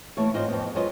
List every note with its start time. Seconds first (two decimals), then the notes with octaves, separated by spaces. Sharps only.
0.17 E3 A3 A#3 C#5
0.34 G#2 C4 F4 D#5
0.48 F2 B3
0.75 F#3 G#3 F4 F#4 B4 D#5